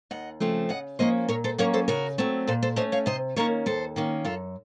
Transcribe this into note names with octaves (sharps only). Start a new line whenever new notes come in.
D#2 D#5 F#5
C#3 F3 A3 C4
C#3 D#5 F#5
F3 A#3 C#4 C5 D#5
A#2 A#4 C#5
A4 C5
F#3 A#3 C#4 A#4 C#5
A4 C5
C#3 F#4 A#4
F#3 A3 C4
A#2 A4 C5
A4 C5
A3 C#4 C5 D#5
C#5 F5
C3 C5 D#5
D#3 A#3 C#4 A#4 C#5
D#2 A4 C5
D#3 A#3 C#4
F#2 F4 A4